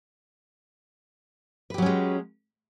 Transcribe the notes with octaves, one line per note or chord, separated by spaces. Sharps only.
F#3 G#3 C#4 G4 B4